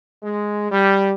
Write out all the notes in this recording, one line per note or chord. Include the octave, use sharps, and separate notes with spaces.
G#3
G3